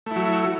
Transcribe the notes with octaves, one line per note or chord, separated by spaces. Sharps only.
F#3 A3 E4